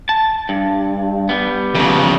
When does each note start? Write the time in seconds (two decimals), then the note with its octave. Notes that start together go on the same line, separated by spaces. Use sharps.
0.09 A5
0.49 G2
1.29 G3 B3
1.74 F2 C#3